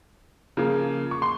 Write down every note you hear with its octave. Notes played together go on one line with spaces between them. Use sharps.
C#3 F3 A#3
C#6
C6